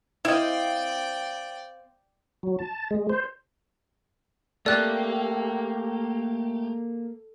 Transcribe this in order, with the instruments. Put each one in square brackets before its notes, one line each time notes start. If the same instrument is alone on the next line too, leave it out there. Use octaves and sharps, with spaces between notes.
[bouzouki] C4 F5 [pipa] E4 D#5 [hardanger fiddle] D5 G5
[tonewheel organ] F#3
A5
G#3
C5
[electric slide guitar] A3 G4 [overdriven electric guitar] A#3 [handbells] A4 [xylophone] D5 F#6